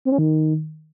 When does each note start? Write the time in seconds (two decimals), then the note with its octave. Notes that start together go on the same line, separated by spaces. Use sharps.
0.05 C4
0.12 C#4
0.18 D#3